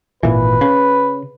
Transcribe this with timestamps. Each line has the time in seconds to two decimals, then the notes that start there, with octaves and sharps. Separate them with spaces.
0.23 G#1 A#2 E3 B4
0.61 C#3